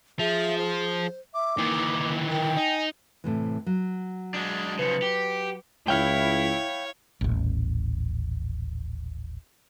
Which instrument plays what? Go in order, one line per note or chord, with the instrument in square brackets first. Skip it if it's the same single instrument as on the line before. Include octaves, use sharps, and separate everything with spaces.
[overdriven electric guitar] F3 [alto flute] G#4 [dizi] E5
[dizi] C5
[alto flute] E5 [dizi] D6
[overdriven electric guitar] D#3 E3 [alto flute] A#3
[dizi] A#4 [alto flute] G5
[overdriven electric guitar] D#4 [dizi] G#5
[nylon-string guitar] A2 C3 E3
F#3
[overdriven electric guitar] G#3 D4
[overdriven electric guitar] C#3 F3 [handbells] B4 C#7
[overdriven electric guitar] G4
[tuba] C#2 [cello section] E4 [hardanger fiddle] C#5 [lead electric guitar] F5 G5
[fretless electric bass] D#1 A1